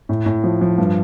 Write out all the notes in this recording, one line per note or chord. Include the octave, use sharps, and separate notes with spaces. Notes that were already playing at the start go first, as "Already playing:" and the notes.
A2
A2
F3
F3
G2